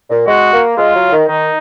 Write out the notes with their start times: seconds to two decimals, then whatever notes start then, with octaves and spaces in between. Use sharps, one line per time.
0.10 A#2
0.27 G#3 F#4
0.53 A#3
0.78 G#3 F4
0.95 F#3
1.12 D#3
1.28 D#3 D#4